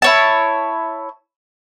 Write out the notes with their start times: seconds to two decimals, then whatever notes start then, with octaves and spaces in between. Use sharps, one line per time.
0.02 E4 C#5 A5